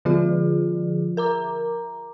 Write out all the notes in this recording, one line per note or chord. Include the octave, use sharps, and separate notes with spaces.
D3 F3 F4 G#4
A#4 A#5 D6